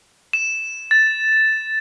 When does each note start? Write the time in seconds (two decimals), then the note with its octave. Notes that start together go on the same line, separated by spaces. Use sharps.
0.33 E7
0.91 A6